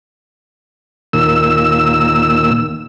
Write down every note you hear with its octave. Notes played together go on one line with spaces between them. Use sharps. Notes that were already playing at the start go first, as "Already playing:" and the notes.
D#2 A#2 E6